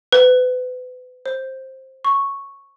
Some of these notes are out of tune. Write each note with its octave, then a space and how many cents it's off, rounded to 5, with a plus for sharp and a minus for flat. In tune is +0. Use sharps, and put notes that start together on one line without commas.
B4 +35
C5 +15
C#6 +0